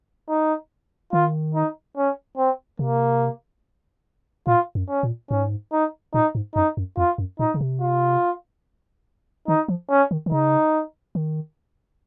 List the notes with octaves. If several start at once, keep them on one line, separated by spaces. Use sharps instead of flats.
D#4
D#3 F4
D#4
C#4
C4
C3 A#3
A#2 F4
F#2
C#4
A#2
G#2 C#4
D#4
A#2 D#4
G#2
F#2 D#4
F#2
F2 F4
F#2
A#2 D#4
C#3
C3
F4
D#3 D#4
F3
C#4
D#3
D#3
C#3 D#4
D#3